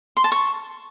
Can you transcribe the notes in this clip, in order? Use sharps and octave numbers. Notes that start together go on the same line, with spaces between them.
C6
A5
C#6